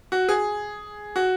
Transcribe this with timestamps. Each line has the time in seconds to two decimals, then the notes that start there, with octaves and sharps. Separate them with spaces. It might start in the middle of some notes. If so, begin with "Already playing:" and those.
0.12 F#4
0.29 G#4
1.16 F#4